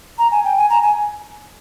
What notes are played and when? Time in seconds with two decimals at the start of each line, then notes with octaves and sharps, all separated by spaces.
0.18 A#5
0.31 G#5
0.44 G5
0.57 G#5
0.70 A#5
0.82 G#5